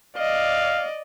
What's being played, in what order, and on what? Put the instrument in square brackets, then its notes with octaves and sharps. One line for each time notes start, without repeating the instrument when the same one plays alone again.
[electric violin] D5 D#5 [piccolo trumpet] F5